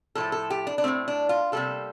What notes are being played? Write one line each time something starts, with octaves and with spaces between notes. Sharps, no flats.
A2 F3 A3 A4
A4
G4
D4
D4
A2 F3 A3 C4
D4
F4
C3 G3 A#3 A4